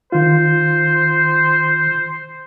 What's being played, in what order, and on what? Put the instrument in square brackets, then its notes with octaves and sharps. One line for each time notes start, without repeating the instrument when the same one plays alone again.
[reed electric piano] D#3 F4 [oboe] C5